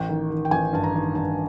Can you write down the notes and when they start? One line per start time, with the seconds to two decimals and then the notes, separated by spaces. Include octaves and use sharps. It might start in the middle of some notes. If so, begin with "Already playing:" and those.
Already playing: A1 G5
0.09 D#3
0.30 D#3
0.45 G5
0.51 A1 G#5
0.73 G2 A5
0.84 A#5
0.94 D#3
1.15 G2 A5